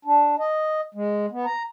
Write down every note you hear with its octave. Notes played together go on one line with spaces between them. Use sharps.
D4
D#5
G#3
B3
A#5